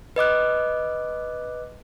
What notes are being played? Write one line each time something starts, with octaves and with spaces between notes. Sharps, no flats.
B4 D#5 D6 F#6